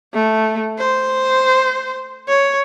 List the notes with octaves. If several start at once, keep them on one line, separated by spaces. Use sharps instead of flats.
A3
C5
C#5